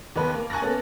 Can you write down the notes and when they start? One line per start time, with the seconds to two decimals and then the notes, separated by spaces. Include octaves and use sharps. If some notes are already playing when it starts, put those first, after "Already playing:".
0.16 D#2 B3 B4
0.34 A#3
0.50 G#5 C#6 F#6 A6 A#6
0.61 A#3 B3 C#4 A4